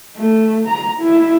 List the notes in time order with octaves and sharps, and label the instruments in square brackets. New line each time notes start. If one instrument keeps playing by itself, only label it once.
[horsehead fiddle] A3
A#5
E4